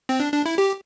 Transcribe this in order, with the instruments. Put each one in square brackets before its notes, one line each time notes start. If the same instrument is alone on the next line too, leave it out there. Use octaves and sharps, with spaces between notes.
[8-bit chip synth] C4
D4
D4
E4
G4